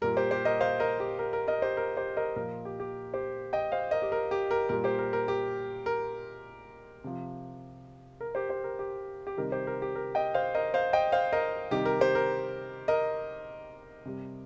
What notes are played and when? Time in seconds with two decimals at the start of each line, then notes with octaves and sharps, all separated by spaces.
0.02 A#2 G3 A#4
0.17 G4 C5
0.31 G4 C5
0.45 A#4 D#5
0.61 C5 F5
0.80 A#4 D#5
1.00 G4
1.19 A#4
1.33 A#4
1.48 A#4 D#5
1.62 G4 C5
1.77 A#4
1.97 G4 C5
2.17 A#4 D#5
2.36 A#2 F3 A#4
2.65 G4
2.80 G4
3.14 G4 C5
3.53 D#5 G5
3.72 C5 F5
3.91 A#4 D#5
4.02 G4
4.12 A#4
4.31 G4
4.51 A#4
4.69 A#2 G3 A#4
4.84 G4 C5
4.99 A#4
5.13 A#4
5.28 G4
5.86 A#4
7.04 C3 F3
8.21 A#4
8.35 G4 C5
8.49 G4 C5
8.64 A#4
8.79 G4
9.27 G4
9.37 C3 D#3 G3 A#4
9.52 G4 C5
9.67 A#4
9.82 G4
9.95 A#4
10.15 D#5 G5
10.34 C5 F5
10.55 A#4 D#5
10.74 C5 F5
10.93 D#5 G5
11.12 C5 F5
11.33 A#4 D#5
11.71 C3 D#3 G3 G4
11.85 A#4
12.01 G4 C5
12.15 A#4
12.88 A#4 D#5
14.05 C3 G3